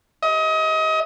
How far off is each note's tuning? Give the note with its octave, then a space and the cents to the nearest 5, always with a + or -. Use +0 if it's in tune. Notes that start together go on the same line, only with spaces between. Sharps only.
D#5 +30